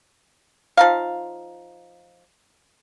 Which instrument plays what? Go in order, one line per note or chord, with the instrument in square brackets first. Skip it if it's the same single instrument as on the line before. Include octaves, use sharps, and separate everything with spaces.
[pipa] F3 D#4 F5